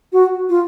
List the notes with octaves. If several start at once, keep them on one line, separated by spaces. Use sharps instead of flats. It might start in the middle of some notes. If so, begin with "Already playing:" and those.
F#4
F4